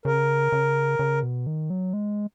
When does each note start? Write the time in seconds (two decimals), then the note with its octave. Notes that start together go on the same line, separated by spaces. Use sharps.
0.05 C#3 A#4
0.52 C#3
0.99 C#3
1.23 B2
1.47 D#3
1.70 F#3
1.93 G#3